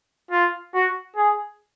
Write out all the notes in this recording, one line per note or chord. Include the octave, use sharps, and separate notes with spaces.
F4
F#4
G#4